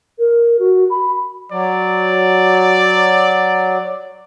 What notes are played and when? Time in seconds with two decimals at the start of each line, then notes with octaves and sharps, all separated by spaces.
0.18 A#4
0.59 F#4
0.90 B5
1.52 F#3 D5